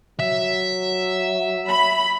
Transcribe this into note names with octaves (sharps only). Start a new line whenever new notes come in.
F#3 E5
B5